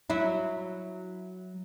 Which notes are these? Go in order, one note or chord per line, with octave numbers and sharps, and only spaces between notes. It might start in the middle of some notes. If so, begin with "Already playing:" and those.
F#3 E4